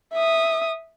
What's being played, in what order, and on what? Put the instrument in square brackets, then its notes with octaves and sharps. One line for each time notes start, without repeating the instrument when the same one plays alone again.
[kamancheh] E5 D#6